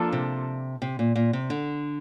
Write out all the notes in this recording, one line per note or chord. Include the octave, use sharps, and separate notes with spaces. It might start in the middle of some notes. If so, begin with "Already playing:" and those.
Already playing: F3 A#3 D4 F4 A4
C3
C3
A#2
A#2
C3
D3